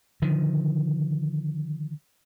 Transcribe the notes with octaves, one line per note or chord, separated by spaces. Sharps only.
D3 D#3 F3